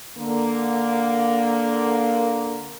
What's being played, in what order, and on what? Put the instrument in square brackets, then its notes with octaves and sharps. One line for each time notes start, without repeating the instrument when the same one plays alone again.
[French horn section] D3 A#3